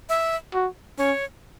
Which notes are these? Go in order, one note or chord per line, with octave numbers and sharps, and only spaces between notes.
E5
F#4
C#4 C#5